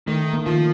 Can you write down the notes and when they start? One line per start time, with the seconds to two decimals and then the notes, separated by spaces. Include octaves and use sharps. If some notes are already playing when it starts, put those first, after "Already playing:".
0.07 D#3 A3
0.33 A#3
0.46 D#3 F3